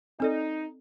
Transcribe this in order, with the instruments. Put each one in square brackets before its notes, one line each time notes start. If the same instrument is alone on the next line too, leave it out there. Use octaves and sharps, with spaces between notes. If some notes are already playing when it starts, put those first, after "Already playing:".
[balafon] C4 A4 D5 [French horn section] D#4